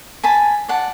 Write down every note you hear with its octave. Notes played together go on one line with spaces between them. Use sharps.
G#5 A5 B5
D5 F#5 A5